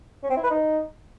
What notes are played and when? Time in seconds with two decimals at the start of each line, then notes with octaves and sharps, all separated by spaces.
0.23 C#4
0.30 C4
0.37 E4
0.44 B4
0.50 D#4